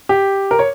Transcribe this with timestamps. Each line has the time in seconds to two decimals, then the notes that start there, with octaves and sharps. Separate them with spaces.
0.09 G4
0.51 A#4
0.59 C#5